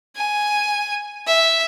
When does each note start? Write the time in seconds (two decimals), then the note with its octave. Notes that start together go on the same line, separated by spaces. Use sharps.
0.16 G#5
1.27 E5